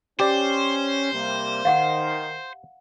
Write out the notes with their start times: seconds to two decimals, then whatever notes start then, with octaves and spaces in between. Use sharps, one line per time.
0.20 C#4 G4 C5 D5
1.13 C3 G3 A#3
1.65 D#3 F5 F#5